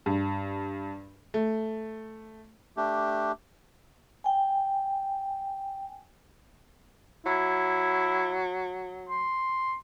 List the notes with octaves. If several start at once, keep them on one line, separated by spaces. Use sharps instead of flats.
G2
A3
A3 D4 G4
G5 G#5
F#3 E4
C6